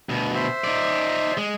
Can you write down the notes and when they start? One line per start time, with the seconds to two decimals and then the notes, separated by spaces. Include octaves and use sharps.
0.09 D2 B2
0.35 C5 E5
0.64 D#4 D5
1.37 G#3